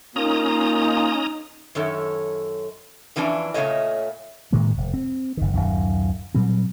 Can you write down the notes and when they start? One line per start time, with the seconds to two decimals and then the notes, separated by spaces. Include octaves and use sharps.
0.16 A#3 C#4 D#4 F4 A#5 D#6
1.75 F#2 D#3 A4 C#5
3.16 E2 E3 F3 C#4 D4
3.54 A#2 C#3 A3 C#5 D#5
4.52 A2 D#3 G#3 A#3
4.77 F1
4.94 C4
5.37 F#1 D#3
5.54 D1 B1 F#2 D#3
6.35 A#2 F#3 G3 C4